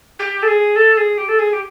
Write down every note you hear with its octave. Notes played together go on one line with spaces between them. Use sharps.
G4
A4
G#4
A4
G#4
G4
A4
G#4
G4